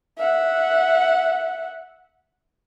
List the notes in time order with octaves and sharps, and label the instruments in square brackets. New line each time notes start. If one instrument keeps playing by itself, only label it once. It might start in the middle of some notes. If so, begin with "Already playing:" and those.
[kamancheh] E5 F#5